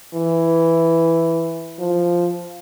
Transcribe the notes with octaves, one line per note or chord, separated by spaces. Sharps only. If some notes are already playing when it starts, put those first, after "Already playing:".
E3
F3